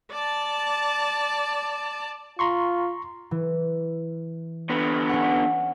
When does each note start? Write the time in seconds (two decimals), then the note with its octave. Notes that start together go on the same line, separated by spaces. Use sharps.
0.12 D5 A5
2.39 F4 A#5 C6 C#6
3.31 E3
4.70 D3 B3
5.09 C#4 F#5